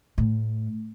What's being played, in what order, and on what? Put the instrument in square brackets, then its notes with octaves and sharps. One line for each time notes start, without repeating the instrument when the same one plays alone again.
[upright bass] A2